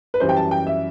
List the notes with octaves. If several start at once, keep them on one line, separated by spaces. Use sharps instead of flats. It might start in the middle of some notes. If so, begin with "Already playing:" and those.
B4
F#2 E3 G3 C5
G5
A5
G5
E5